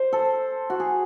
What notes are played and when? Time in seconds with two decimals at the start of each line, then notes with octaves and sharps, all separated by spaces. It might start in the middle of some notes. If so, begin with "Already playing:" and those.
Already playing: C5
0.13 A4
0.70 F#4
0.80 G#4